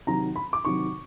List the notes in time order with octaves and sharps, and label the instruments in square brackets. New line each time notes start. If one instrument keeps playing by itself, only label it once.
[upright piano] C3 D#3 F#3 A#5
B5
D6
C3 D#3 F#3 C#6